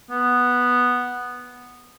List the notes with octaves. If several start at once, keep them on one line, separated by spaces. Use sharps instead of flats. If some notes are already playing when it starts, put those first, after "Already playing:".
B3